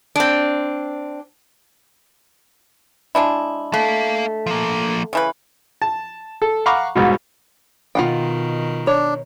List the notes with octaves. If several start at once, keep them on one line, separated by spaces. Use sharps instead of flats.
C4 D4
G#3 D4 E4
A3 A#3 F5
F3 A#3
C#3 E3 B4
A5
A4
F5 F#5 A#5 B5 C#6 D6
C2 G#2 B2
B2 D#3 F4 F#5 G5
D4 C#5